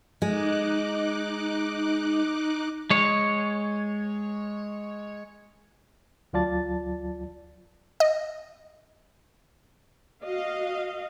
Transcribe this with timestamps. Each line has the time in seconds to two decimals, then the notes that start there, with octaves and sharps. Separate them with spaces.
0.22 G#3 D#4 D6 F#6
2.90 G#3 C#5
6.33 D2 F#3 F4 D5 A5 A6
8.00 D#5
10.24 F#4 D#5 F5